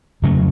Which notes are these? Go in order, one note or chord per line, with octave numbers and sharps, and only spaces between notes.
F2 C#3 F#3 A3